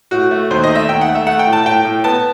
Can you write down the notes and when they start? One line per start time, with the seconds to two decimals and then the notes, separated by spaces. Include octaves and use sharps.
0.11 A2 F#4
0.31 A3
0.50 D#2 C5
0.64 D#5
0.69 A3
0.75 E5
0.89 D#2 G5
1.01 F#5
1.08 A3
1.15 E5
1.27 A3 F#5
1.39 G5
1.47 A2
1.53 A5
1.66 A2 G5
1.85 A2
2.04 B3 A5